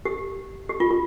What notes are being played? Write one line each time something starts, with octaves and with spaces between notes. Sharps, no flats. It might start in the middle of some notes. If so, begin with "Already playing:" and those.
G4
G4
F4
F4